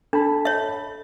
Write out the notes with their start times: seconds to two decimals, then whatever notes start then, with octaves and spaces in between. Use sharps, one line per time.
0.13 D4 A4 A5 B5
0.45 C#5 E5